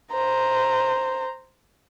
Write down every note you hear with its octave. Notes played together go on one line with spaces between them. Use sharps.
C5 A#5